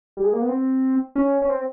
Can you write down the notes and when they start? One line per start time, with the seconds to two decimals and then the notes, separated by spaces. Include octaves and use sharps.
0.17 G3
0.24 G#3
0.33 A#3
0.42 B3
0.49 C4
1.15 C#4
1.42 C#4
1.49 C4